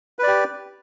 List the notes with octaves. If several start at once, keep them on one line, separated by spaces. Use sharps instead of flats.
G4 B4 D5